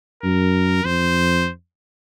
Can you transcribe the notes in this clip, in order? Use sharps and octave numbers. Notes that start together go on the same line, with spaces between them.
F#2 A#4
F2 C5